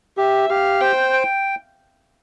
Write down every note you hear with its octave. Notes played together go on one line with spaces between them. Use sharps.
G4 E5
G4 F5
C5 G5
G5